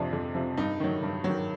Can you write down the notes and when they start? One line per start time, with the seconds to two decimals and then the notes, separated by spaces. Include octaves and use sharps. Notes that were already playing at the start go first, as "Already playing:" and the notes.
Already playing: F2 C3 F3 D4
0.13 F2
0.35 C3 F3
0.57 G2 D#4
0.80 D#3 F#3
1.03 G2
1.24 D#3 F#3